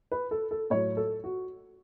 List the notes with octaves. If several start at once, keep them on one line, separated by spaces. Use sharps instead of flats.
B4
A4
A4
A2 F#3 C#5
A4
F#4